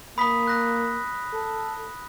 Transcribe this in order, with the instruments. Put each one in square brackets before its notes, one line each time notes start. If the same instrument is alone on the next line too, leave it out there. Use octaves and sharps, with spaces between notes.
[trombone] A#3 [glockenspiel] B5 D#6 B6
[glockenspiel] F#6 A#6
[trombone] A4